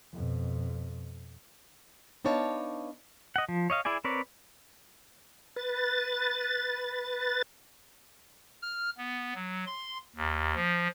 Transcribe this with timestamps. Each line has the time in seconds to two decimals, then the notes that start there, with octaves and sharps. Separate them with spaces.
0.13 F2 B2
2.25 B3 D4 D#4 C#5 F5 A5
3.36 D#5 F#5
3.49 F3
3.70 C#5 D#5 F5
3.85 E4 G#4 D5 G#5
4.04 C4 A#4 B4 C#5 D5
5.56 B4 A6
8.62 F6
8.98 B3
9.35 F#3
9.66 C6
10.16 D#2
10.55 F3